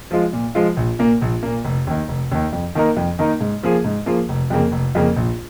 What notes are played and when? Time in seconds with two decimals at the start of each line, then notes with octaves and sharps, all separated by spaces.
0.11 F3 G#3 F4
0.33 A#2
0.55 F3 G#3 F4
0.77 A#1
0.99 A#2 A#3
1.22 A#1
1.43 A#2 A#3
1.65 F1
1.87 D#2 D#3
2.08 F1
2.31 D#2 D#3
2.52 F2
2.75 D#3 A#3 D#4 A#4
2.97 F2
3.19 D#3 A#3 D#4 A#4
3.40 G#2
3.63 F3 A#3 F4 G#4
3.84 G#2
4.06 F3 A#3 F4 G#4
4.29 F1
4.50 F2 C#3 A#3
4.72 F1
4.95 F2 C#3 A#3
5.16 A#1